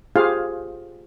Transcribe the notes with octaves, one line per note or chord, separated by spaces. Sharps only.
F4 G4 G#4 C5 F5